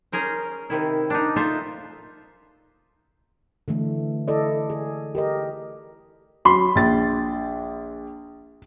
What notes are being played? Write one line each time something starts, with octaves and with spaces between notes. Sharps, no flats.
C#4 G#4 A#4 C5
C3 D#3 E4
D4 D#4
D#4 F4 A4 C5 E5
D3 E3 A3
E4 A4 D5 D#5
G#4
G4 A#4 D#5
F#3 B5 C6
A#1 A6